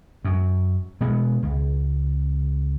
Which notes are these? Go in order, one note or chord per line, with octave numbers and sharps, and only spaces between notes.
F#2
B2 G#3 B3
C#2